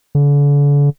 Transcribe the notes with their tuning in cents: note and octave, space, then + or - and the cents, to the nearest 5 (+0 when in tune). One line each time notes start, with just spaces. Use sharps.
D3 -40